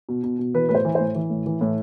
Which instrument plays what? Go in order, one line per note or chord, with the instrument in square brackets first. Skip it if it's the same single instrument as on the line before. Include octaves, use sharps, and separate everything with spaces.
[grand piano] B2
B2
B2
E3 B4
A2 B4
C5
E3
A2 C5
E3
A2
E3
A2